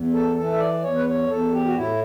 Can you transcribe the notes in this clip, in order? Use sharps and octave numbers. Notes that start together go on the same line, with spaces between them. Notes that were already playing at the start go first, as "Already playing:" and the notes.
Already playing: E2
A4
E3 A4
E5
D5
E2 C#5
B4
C#5
E2 A4
G4
F#4
A2 E4